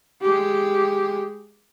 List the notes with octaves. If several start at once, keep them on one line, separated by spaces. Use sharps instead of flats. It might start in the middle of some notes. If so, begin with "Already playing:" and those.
G#3 G4